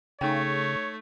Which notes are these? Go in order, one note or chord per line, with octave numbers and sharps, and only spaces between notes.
C#3 A3 D#4 C#5 G5